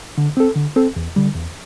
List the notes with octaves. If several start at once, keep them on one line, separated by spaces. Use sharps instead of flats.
D3
C4 A4
D3
C4 A4
E2
D3 G3
E2